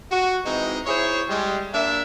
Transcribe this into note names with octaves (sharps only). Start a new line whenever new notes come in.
F#4
E3 G#3 C4 D#4
E4 G#4 C5 C#5
G3 G#3
A#3 D4 E5